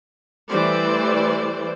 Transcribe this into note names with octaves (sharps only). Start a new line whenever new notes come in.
E3 G3 A3 C5 D5